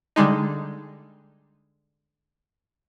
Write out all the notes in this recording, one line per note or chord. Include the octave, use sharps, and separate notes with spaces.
D3 G3 G#3 D#4